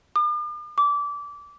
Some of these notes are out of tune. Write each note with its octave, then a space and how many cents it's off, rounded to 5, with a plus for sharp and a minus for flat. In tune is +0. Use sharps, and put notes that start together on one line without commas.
D6 +45
D6 -20